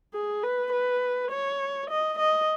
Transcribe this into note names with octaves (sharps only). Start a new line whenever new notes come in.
G#4
B4
B4
C#5
D#5
D#5